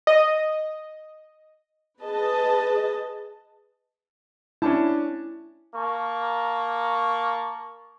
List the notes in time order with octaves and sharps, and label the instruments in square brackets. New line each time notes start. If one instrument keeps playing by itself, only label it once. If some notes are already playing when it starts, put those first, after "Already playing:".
[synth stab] D#5
[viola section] G#4 B4 D#5 A5
[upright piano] C#4 D4 A5 [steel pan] E4
[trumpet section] A#3 A5 C#6